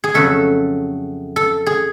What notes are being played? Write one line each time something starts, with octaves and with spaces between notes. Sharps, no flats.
G#4
F2 C#3 F#3 A3 A4
A4
G#4